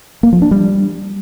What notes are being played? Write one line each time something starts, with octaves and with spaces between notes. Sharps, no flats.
A#3
F3
D4
G3